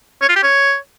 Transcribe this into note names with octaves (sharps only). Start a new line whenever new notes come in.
C#5
F4
G4
C#5